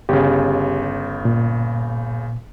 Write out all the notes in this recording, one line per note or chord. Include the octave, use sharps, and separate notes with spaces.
G1 C#3 G4
A#2